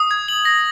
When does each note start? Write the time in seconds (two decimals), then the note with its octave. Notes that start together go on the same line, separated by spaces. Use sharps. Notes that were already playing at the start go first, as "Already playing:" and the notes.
Already playing: D#6
0.11 G#6
0.28 F#7
0.45 A#6